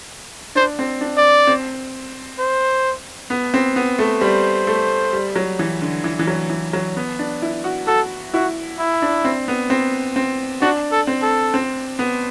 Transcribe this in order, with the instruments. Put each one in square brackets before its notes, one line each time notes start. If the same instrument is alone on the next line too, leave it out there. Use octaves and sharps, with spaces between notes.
[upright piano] D4 [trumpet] C5
[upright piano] C4
D4
[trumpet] D5
[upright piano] C4
[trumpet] C5
[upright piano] B3
C4
B3
A3
[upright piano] G3 [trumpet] C5
[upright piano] A3
G3
F#3
E3
D3
E3
E3
F#3
E3
F#3
B3
D4
E4
F#4
[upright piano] F#4 [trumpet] A4
[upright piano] E4 [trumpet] F#4
[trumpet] E4
[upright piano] D4
C4
B3
C4
C4
[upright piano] D4 [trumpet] F#4
[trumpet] A4
[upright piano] C4
[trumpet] A4
[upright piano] C4
B3